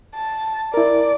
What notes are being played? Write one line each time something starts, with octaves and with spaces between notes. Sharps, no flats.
A5
E4 A#4 D5